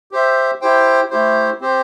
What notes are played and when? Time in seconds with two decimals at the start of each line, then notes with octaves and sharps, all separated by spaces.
0.11 G4 C5 E5
0.61 E4 G4 C5 G5
1.10 A3 E4 G4 C5
1.61 C4 G4 C5